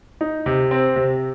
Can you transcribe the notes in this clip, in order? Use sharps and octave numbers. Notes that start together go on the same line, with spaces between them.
D#4
C3
C4
C3